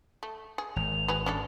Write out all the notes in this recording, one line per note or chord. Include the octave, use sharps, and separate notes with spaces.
A3
G#4
G#1 F7
F#3 G#4 B4
C#4 D4 A4